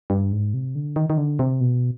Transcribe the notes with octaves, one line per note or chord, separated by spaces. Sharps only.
G2
G#2
C3
D3
D#3
D#3
D3
C3
B2